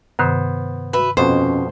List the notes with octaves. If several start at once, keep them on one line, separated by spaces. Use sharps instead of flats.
G2 C3 D#3 B3 C5
F#4 B4 E5
F2 B2 C#4 C5